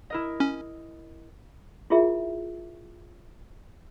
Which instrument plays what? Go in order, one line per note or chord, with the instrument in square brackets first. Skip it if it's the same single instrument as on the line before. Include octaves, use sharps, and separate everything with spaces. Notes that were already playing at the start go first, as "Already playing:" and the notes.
[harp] E4 A#4 D#5
[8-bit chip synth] C#4
[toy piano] E4 F4 G#4 A#4 E5